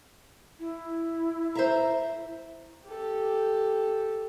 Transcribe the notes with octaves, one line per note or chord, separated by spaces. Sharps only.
E4
C5 E5 A#5
G4 A4